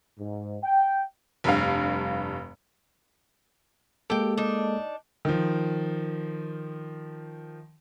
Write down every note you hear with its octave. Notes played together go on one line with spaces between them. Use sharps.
G#2
G5
F1 G2 F5
G#3 A#3 G4 A4 G5
D4 D#4
D#3 F3